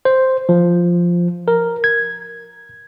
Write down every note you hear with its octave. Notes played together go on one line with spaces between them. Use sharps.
C5
F3
A#4
G#6